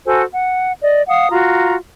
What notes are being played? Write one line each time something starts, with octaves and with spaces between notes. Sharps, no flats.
F#4 A4 C5 G#5
F#5
D5 D#5
F5 F#5 D#6
F4 F#4 A#5